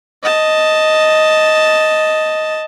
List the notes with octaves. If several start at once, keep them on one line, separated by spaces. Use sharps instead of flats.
D#5 A5